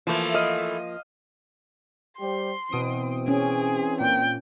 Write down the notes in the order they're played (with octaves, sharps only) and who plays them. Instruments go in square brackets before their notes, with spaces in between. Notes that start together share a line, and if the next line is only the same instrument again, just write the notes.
[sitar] E3 A3 [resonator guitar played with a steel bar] F3 A#3
[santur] D#5 F5
[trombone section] G3 G4 C5 [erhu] C6
[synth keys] B2 D#6 D7 [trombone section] E3 C4
[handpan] C#4 [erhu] G#4
[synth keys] A#2 [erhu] G5